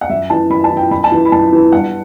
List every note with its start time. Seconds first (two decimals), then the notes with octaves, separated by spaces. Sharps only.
0.01 F#5
0.10 F#2 E5
0.30 E3 A5
0.50 F#2 B5
0.64 A5
0.70 E3
0.77 G5
0.91 F#2 B5
1.04 A5
1.12 E3
1.25 B5
1.32 F#2 A5
1.52 E3
1.72 G2 F#5